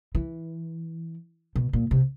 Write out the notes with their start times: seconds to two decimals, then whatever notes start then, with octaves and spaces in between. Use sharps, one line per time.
0.15 E3
1.56 B2
1.73 A#2
1.91 C3